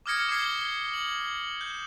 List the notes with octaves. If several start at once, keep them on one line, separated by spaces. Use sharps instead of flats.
D6 D#6 F6 G#6 A#6 C#7
D6 F6 G#6 C7 G7
F#7
G6